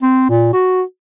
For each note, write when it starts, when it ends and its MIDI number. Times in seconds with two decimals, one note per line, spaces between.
0.03 0.26 60
0.30 0.50 46
0.53 0.82 66